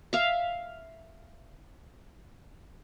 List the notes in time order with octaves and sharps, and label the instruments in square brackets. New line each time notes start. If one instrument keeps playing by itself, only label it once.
[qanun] E5 F5